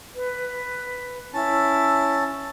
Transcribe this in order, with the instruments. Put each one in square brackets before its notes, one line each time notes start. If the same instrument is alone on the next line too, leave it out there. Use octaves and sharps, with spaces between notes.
[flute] B4
[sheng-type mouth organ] C#4 A5 [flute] E4